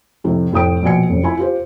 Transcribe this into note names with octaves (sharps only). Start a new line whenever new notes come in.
F2 A2 C3
F1 A2 G5 D#6 D7
A#1 B2 G#5 C#7
F1 F#2
E4 F4 G#5 B5
F4 G4 C5